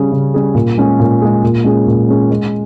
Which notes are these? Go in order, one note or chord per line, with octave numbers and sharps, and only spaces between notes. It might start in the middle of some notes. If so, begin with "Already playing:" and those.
Already playing: C#3 G3 C#4 G#4
C#3
G3 C#4 G#4
A#2
G#3 C#4 G#4
A#2
G#3 C#4 G#4
A#2
G#3 C#4 G#4
A#2
G#3 C#4 G#4
G#3